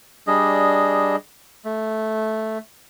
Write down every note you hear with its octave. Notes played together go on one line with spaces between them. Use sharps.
G3 D4 G#4 D#5
A3